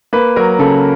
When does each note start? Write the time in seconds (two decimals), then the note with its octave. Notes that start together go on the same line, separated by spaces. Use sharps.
0.13 A#3 B4
0.36 F#3 A#4
0.59 C#3 A4